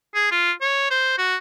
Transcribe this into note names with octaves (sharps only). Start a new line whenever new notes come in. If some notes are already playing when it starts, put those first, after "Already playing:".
G#4
F4
C#5
C5
F#4